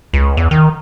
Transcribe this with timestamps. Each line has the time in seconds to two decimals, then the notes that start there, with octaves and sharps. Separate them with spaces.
0.14 C#2
0.37 E2
0.51 D#3